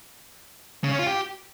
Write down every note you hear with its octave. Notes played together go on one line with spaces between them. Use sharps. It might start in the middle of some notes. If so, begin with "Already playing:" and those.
C#3
C#4
F4
G4